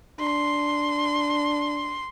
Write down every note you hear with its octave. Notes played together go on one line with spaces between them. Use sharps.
D4 C6